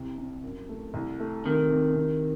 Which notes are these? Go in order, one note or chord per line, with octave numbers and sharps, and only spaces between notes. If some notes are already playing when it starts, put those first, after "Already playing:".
Already playing: C2 C3
C3
F#2
A3
C2
A3
C3 D#3
C3
C3